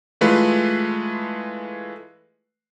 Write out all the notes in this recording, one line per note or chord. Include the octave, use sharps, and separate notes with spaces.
E3 G#3 A3 F4 B4